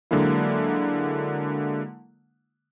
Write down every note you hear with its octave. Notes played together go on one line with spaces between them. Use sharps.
D3 F#3 G#3 A#3 E4